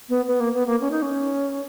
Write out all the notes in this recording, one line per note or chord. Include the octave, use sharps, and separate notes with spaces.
B3
B3
A#3
B3
A#3
C#4
D#4
C#4